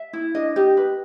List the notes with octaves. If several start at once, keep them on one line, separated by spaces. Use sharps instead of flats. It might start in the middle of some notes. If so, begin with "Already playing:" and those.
Already playing: E5
E4
D4 D#5
G4 D#5
B4